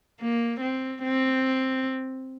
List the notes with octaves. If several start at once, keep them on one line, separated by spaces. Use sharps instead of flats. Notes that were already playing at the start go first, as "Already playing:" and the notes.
A#3
C4
C4